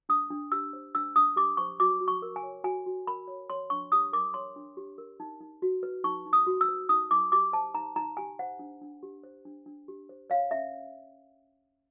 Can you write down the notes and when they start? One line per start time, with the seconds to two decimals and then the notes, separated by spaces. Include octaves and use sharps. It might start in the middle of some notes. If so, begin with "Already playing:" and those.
0.09 D4 D#6
0.30 D4
0.52 G4 E6
0.73 C5
0.95 D4 E6
1.16 D4 D#6
1.36 G4 D6
1.57 C5 C#6
1.80 F#4 D6
2.01 F#4
2.08 C#6
2.22 A#4
2.36 G#5
2.43 C#5
2.64 F#4 G#5
2.86 F#4
3.07 A#4 B5
3.28 C#5
3.50 C#5 C6
3.70 D4 C#6
3.92 G4 D#6
4.13 A#4 D6
4.34 C#5 C6
4.56 D4
4.77 G4
4.98 A#4
5.20 D#4
5.41 D#4
5.62 F#4
5.83 B4
6.04 D#4 C#6
6.26 D#4
6.33 D#6
6.47 F#4
6.61 E6
6.68 B4
6.89 D#4 D#6
7.11 D#4 D6
7.32 G4 D6
7.53 C5 A5
7.75 D#4 A#5
7.96 D#4 A#5
8.17 G4 G#5
8.39 C5 F#5
8.59 D4
8.82 D4
9.03 G4
9.23 C5
9.45 D4
9.66 D4
9.88 G4
10.09 C5
10.30 C#5 F5
10.51 C#4 E5